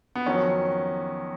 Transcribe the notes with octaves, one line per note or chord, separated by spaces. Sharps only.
B3
F2 D#3 F#3 C#4